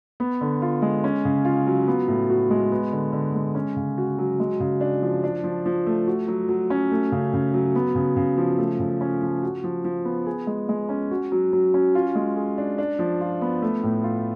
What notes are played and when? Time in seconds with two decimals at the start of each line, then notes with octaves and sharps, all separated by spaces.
0.20 B3
0.41 D3
0.62 F4
0.82 G#3
1.04 C#4
1.25 C#3
1.45 F4
1.67 F#3
1.87 B3
2.08 A2
2.30 F#4
2.50 G#3
2.72 B3
2.92 D3
3.13 D3
3.35 G#3
3.55 C#4
3.76 C#3
3.98 F#4
4.19 F#3
4.40 G#3
4.60 C#3
4.81 D4
5.02 F3
5.24 D4
5.44 F3
5.66 F3
5.86 A3
6.08 F#4
6.28 F#3
6.49 F#3
6.70 C#4
6.92 A3
7.12 C#3
7.34 C#3
7.54 F#3
7.75 B3
7.95 C#3
8.17 C#3
8.37 F3
8.58 A3
8.80 C#3
9.01 C#4
9.22 F3
9.43 F#4
9.64 F3
9.85 F3
10.05 B3
10.26 G#4
10.47 G#3
10.69 G#3
10.89 C#4
11.11 F#4
11.32 F#3
11.53 F#3
11.74 C#4
11.95 F4
12.15 G#3
12.36 G#4
12.58 D4
12.78 D4
12.99 F3
13.21 F4
13.42 B3
13.62 A3
13.83 A2
14.04 F4